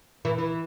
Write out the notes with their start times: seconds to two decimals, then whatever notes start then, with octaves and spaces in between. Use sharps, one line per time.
0.25 E3
0.38 E3